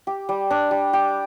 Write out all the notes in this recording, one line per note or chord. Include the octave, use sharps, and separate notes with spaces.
G4
G3
D4
G3
G4